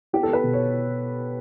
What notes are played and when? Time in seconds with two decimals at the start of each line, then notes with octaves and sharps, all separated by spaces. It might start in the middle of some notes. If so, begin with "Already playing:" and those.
0.13 B3 G4
0.23 A4
0.28 B3 B4
0.43 B2
0.53 C#5